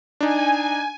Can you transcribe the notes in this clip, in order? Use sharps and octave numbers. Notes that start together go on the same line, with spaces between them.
D4 D#4 G#5